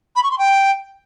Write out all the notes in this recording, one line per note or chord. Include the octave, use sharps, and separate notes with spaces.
B5
C#6
C6
G5